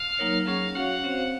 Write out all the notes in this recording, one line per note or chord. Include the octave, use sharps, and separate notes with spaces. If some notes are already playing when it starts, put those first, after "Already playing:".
Already playing: F5
F#3 A#3 D#4 A#4 C#5
F#3 C#4 G#4 F5
C#4 F#4 C#5 F5 F#5
C4 F#4 C5 F5